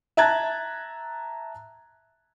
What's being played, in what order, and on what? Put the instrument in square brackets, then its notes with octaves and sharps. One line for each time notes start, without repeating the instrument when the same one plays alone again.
[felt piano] E5 A5 A#5 F#6 G#6 A6